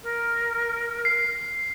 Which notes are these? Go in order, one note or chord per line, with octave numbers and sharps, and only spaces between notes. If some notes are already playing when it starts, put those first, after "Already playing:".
A#4
C7